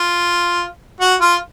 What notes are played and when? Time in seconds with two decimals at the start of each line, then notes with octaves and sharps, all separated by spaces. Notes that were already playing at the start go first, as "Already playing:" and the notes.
Already playing: F4
1.00 F#4
1.21 F4